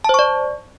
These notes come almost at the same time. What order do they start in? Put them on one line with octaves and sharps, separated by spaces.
A5 C5 C#6 D5